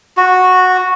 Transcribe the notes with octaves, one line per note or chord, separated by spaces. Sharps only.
F#4